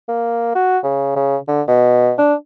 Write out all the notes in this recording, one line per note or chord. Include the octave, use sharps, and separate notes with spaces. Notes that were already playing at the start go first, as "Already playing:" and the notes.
A#3
F#4
C#3
C#3
D3
B2
D4